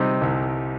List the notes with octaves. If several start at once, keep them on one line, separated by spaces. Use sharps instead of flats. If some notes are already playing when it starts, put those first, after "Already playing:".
Already playing: C3 G3 C4 D#4
C2